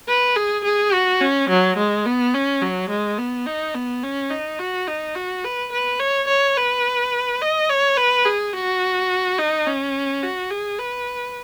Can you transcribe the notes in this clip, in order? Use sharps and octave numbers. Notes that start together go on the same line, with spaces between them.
B4
G#4
G#4
F#4
C#4
F#3
G#3
B3
C#4
F#3
G#3
B3
D#4
B3
C#4
D#4
F#4
D#4
F#4
B4
B4
C#5
C#5
B4
D#5
C#5
B4
G#4
F#4
D#4
C#4
F#4
G#4
B4